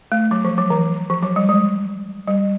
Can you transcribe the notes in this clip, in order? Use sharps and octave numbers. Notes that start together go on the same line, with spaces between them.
A3
F#3
F3
F#3
E3
F3
F#3
G3
G#3
G3